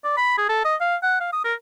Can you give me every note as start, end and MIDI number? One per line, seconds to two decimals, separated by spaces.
0.04 0.14 74
0.17 0.36 83
0.38 0.49 68
0.49 0.61 69
0.65 0.75 75
0.81 0.96 77
1.03 1.18 78
1.20 1.28 77
1.33 1.40 87
1.44 1.54 70